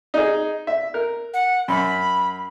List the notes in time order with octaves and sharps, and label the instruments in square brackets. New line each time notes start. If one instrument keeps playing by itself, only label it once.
[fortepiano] D#4 G#4
E5
A#4
[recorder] F#5
[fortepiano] F#2 [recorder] B5